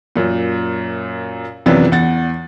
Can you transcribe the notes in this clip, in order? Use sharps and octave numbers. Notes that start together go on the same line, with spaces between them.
F#2 A#2
F#2 C3 E3 F3 B3 D4
E2 F#5 A6